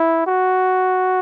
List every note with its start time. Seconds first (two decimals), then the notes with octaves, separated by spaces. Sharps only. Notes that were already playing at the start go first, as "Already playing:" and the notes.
Already playing: E4
0.27 F#4